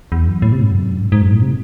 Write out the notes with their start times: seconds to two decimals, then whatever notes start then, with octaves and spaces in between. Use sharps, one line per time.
0.12 E2
0.27 F#2
0.42 A2
0.52 C3
0.62 G#2
0.72 F#2
1.02 G#2
1.12 G#2
1.22 F#2
1.31 A2
1.42 C3